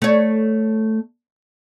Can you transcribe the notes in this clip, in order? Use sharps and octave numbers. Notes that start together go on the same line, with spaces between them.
A3 C#5